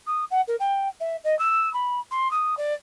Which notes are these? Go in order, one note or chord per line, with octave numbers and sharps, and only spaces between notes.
D#6
F#5
A#4
G5
E5
D#5
E6
B5
C6
D#6
D5